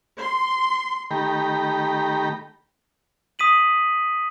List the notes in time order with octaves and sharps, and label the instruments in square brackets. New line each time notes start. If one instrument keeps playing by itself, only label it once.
[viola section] C6
[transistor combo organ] D#3 A3 G4 G5 A#5 B5
[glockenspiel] D#6 B6 D#7 F#7